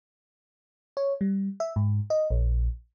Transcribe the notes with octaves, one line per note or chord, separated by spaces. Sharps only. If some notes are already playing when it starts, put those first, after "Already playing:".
C#5
G3
E5
G#2
D#5
A#1